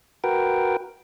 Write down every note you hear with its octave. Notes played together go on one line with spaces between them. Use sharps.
F#4 A#4 B4 G5